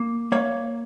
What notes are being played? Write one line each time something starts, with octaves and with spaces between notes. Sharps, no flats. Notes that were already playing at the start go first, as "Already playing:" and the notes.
Already playing: A#3
A#3 C#5 F5